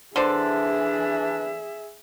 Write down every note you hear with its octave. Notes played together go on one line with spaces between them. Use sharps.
D3 E3 D4 G#4 C5 D5 E5